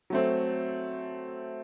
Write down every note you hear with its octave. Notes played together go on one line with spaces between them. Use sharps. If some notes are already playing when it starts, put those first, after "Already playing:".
F#3 A3 C4